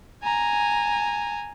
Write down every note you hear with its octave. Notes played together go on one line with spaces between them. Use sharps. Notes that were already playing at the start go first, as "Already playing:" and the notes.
G#5 A#5